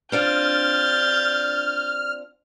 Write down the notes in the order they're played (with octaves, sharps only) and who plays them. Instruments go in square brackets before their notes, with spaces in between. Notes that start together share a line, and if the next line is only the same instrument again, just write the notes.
[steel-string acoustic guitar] C4 D4 F4 [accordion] F6 [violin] G6 A6